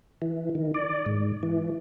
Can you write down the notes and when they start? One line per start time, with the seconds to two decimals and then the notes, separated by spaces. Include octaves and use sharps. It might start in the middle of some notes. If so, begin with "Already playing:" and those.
0.22 E3
0.55 D#3
0.74 D5
1.06 G#2
1.43 E3